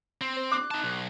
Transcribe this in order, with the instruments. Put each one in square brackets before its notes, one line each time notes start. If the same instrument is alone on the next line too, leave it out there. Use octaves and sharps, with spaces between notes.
[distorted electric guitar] C4
[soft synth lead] C5
[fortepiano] D6 [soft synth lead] F#6
[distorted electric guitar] D#4 A5
B1